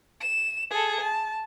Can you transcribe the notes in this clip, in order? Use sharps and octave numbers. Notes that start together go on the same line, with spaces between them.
E7
G#4 A4
A5